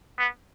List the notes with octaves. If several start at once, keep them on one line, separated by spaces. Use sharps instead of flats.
B3